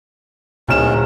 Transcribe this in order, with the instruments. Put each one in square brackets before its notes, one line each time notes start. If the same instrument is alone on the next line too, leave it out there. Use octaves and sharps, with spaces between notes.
[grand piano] D1 E7 [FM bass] A#2 [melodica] C#4 D#4 A#4